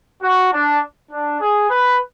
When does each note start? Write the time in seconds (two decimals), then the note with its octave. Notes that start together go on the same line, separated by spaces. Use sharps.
0.22 F#4
0.51 D4
1.11 D4
1.40 G#4
1.70 B4